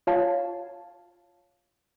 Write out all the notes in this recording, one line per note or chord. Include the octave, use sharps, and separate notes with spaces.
F4 C#5 F5 A5